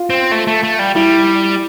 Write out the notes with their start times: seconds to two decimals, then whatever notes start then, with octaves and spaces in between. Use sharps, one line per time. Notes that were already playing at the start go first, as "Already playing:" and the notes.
Already playing: F4
0.10 C4
0.32 A3
0.47 A3
0.63 A3
0.79 G3
0.95 G3 E4